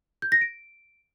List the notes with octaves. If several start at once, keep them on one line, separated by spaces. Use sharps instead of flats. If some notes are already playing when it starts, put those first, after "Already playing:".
G6
A#6
D7